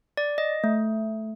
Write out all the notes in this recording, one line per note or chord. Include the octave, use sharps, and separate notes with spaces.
D5
D#5
A3